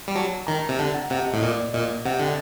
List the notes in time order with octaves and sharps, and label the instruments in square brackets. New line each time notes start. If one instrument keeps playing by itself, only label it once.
[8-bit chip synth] G3
[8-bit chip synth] F#3 [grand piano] A5
[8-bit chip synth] D#3 [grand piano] A#5
[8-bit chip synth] C3
[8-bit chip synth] D3 [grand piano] A5
[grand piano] F#5
[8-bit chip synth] C3 [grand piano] F#5
[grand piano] D#5
[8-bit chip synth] A2
[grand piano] D#5
[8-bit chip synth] A#2 [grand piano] D5
[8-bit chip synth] A#2 [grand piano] D#5
[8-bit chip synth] C3 [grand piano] F#5
[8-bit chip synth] D3 [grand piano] G5